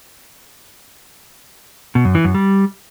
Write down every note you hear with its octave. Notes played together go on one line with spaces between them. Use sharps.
B2
F#2
E3
F#2
G3